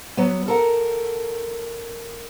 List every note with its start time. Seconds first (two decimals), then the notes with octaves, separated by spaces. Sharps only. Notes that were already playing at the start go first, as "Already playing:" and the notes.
0.17 F#3 B3
0.48 A4 A#4 F#5